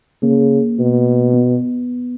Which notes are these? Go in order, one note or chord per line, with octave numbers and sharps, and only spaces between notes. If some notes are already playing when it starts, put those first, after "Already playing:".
C#3 A#3
B2
B3